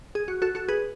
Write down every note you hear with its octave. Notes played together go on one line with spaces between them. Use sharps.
G#4
F#4
F#4 A4
F#4 A4
G#4 B4